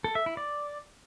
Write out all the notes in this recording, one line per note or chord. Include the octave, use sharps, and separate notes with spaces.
A4
E5
E4
D5